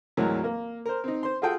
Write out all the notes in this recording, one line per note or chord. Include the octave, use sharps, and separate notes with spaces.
G#1 D2 E3 F#3 A#4
A#3
A#4 C5
C4 D#4
C5 C6
F4 F#4 G#4 A4 G5